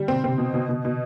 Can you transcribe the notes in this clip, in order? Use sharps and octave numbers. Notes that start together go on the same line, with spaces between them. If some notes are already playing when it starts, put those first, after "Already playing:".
Already playing: D3 G3
B2 C4
C3 C4
B2
B2
B2
B2